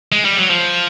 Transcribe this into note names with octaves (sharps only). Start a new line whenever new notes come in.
G#3
G3
F#3
F3